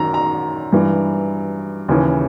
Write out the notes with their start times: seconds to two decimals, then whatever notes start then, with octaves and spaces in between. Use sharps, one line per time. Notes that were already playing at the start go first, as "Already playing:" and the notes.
Already playing: F#2 D#3 A#5
0.14 A#5
0.73 G2 E3
1.88 D#2 C#3 E3